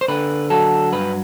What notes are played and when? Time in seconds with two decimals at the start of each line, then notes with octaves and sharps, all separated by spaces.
0.01 C5
0.08 D3 B4
0.50 F#3 A4
0.92 G2 B4